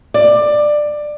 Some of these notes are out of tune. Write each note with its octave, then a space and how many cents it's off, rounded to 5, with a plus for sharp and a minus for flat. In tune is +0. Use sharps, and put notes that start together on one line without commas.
D5 +15